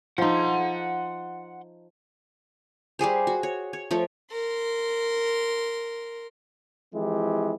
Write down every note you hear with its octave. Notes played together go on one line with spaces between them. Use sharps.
F3 D#4 F#5 C6
G3 G4 G#4 C5
F#4
C#5
C#5
F3 A3 C#5
A#4 C6
E3 F3 G#3 C4 E4 G4